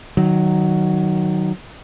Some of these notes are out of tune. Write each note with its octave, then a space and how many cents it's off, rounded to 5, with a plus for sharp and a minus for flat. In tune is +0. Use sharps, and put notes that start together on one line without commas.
D#3 -15 F#3 +5